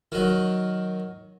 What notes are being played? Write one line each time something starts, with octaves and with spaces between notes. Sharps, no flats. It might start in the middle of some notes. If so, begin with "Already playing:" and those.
D#3 F#3